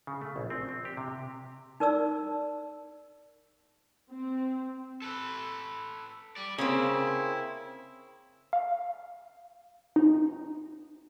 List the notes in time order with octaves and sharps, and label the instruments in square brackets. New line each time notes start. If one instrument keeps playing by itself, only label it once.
[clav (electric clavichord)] C#3
A3
A#1
C4
C4
G4
C3
[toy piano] D#4 A#4 D5 E6
[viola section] C4
[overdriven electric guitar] A4 B4
G4 D5
[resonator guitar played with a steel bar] C#3 A#3 C4 [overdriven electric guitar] E4
[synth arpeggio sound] F5
D#4